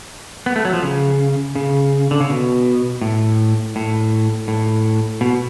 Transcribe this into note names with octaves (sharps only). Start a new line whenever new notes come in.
B3
A3
F#3
F3
C#3
C#3
D3
C#3
B2
A2
A2
A2
B2